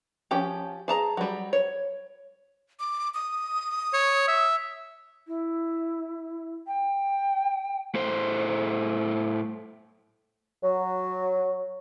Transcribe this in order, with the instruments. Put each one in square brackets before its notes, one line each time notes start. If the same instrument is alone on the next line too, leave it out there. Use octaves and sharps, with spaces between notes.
[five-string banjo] F3 C#4 G4
G#4 A5 A#5
F#3 G3
C#5
[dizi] D6
D#6
[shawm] C#5
E5
[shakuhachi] E4
G5
[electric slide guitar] A2 A3 C5
[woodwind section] F#3